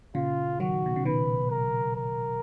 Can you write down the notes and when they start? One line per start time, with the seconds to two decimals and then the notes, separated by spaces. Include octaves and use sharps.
0.15 A#2 C#3 F4
0.60 D#3 F#3 F#4
0.86 B2
0.96 C#3
1.05 B2 D#3 B4
1.51 A#4
1.96 A#4